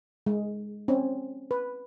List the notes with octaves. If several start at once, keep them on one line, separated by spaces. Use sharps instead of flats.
G#3
C4 C#4
B4